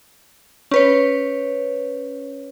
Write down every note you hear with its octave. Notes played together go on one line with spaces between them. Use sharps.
C#4 B4 C#5